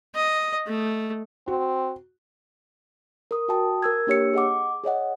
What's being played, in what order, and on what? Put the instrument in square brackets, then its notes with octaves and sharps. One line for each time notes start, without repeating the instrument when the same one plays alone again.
[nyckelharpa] D#5
A3
[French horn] C4 [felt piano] F#4
[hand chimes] A#4 D#6
F#4 G5 A5 D#6
A#4 E6 G#6
A#3 D4 G4 C#5 E6 C#7
G#4 D#5 F#5 D6
G#4 C#5 D#5 F#5